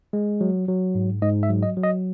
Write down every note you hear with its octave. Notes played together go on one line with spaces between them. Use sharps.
G#3
F#3
F#3
G#2
G#2 D#5
E5
F#3
D#5
F#3
D#5